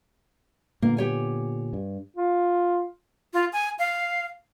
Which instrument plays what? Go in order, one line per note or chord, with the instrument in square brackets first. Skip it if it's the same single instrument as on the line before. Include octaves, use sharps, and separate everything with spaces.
[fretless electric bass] A#2 D3 B3 [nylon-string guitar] A#3
[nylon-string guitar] G4 C#5 G#5
[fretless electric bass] G2
[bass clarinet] F4
[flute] F4
G#5
F5